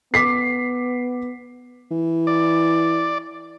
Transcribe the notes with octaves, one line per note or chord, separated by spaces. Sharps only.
B3 D6 B6 C7
E3
D5